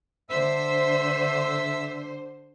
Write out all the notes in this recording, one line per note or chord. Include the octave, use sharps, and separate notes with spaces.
D3 C5 E5 E6